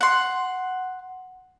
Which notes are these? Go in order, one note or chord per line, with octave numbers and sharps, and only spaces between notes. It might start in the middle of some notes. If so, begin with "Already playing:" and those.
F#5 C6